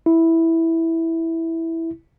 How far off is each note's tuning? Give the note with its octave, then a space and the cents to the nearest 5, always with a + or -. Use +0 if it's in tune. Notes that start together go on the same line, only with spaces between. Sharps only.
E4 -5